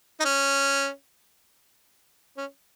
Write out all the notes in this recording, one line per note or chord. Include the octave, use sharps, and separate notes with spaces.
D#4
C#4
C#4